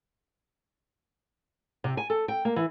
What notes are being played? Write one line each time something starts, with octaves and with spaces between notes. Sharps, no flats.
C3
G#5
A4
G5
A#3
E3